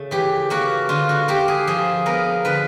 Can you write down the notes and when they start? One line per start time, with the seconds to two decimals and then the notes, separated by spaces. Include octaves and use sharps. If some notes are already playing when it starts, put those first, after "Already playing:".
Already playing: C#3 A3
0.11 E3 G4
0.50 A#3 F#4
0.89 D3 F4
1.09 F#4
1.28 A#3 G4
1.48 G#4
1.67 F3 G#4
2.06 B3 A#4
2.45 D3 B4